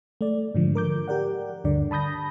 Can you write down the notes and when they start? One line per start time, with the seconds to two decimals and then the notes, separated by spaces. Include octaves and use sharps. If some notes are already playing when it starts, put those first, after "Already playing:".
0.21 A3 D5
0.55 G#2 D3 F3
0.75 A#4 D6 G6
1.08 G4 A#4 D5 F#5
1.64 D2 G2 D3 D5
1.91 A5 B5 D#6 G6 A#6